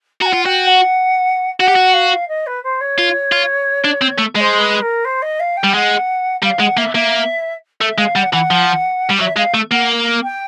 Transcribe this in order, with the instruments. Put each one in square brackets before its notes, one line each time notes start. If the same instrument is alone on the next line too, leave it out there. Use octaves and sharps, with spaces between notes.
[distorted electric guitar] F#4 [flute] F#5 A#5
[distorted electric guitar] F4
[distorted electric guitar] F#4 [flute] G5
[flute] F#5
[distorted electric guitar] F#4 [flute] F#5
[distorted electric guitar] G4
F#4
[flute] F5
D#5
B4
C5
C#5
[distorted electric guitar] F4
F4
D4
C4
A3
[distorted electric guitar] G#3 [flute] D#5
[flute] C5
B4
A#4
C5
D#5
F5
G5
[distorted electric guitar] G3
[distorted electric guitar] G#3 [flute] F#5
[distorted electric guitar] G3 [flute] F5
[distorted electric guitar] G#3 [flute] F#5
[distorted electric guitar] A#3 [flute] E5
[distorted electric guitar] A#3 [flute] E5
[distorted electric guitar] A3 [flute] E5
[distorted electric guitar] G#3 [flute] F5
[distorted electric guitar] G3 [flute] F#5
[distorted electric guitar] E3 [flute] F#5
[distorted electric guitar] F3
G3
[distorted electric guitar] F#3 [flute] E5
[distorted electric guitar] G#3 [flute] F5
[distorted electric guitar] A3
[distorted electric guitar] A#3 [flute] F#5
[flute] G5